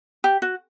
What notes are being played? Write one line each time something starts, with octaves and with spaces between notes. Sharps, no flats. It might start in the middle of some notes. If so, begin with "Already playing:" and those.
G4
F#4